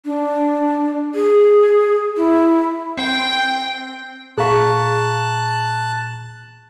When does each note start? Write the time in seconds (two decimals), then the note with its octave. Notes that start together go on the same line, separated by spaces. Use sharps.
0.05 D4
1.15 G#4
2.17 E4
2.97 C4 G5 G6
4.38 A#2 G#4 F5 A5 A#5 C#6 F#6